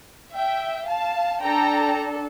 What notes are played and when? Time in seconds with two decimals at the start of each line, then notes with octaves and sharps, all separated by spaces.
0.34 E5 G5
0.88 F5 A5
1.42 D4 A4 G5 A#5